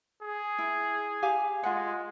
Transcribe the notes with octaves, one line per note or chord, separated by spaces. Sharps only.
G#4
E4
G4 F5 G#5
G#3 F4 F#5